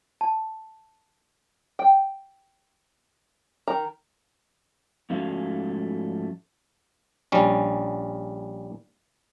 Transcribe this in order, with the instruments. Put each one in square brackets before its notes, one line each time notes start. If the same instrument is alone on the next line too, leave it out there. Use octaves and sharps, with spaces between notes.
[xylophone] A5
[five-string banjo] G5
D#3 A#5
[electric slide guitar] G#2 F3 A3 C#4 F#4 F5
[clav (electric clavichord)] A#1 G3 C#4